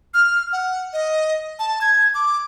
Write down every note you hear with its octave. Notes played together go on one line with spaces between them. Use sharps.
F6
F#5
D#5
A5
G#6
D6